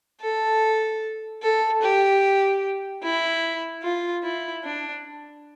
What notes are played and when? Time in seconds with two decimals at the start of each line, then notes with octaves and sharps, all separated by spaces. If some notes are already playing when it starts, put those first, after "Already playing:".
0.21 A4
1.42 A4
1.82 G4
3.03 E4
3.83 F4
4.23 E4
4.63 D4